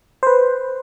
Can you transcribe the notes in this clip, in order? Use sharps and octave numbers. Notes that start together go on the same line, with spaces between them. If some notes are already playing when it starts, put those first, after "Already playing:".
B4 C5